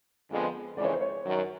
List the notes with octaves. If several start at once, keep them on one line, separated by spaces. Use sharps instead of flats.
F2 D3 F3 G#3 B3
F2 C#3 E3 G#3 D5
C#5
C5
C#5
F#2 D#3 F#3